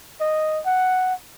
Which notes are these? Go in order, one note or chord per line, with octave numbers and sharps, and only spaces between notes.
D#5
F#5